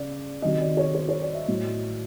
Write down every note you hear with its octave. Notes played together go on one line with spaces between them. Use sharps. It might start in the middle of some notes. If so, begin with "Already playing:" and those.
Already playing: C#3 D5
C3 D#3 F#3 D#5
D5
C#5
C5
C#5
D5
E5
A2 F#3